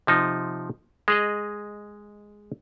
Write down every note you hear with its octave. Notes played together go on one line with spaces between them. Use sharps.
C3 F3 D#4
G#3 G#4 D#5